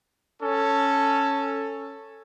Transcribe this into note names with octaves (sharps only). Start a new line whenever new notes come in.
C#4 A4